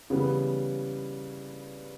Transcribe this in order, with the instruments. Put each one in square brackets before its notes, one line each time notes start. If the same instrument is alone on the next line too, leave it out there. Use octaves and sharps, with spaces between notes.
[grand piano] C#3 E3 G3 B3